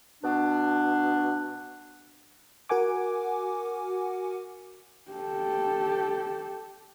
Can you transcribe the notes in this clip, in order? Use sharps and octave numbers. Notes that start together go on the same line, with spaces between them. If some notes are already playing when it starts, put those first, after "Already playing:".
B2 B3 D4
F#4 A#4 F#5 G#5 D6
G4 A4